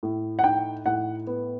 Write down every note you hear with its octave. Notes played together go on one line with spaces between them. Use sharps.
A2
F#5
D#4 G5
A2 F#5
B3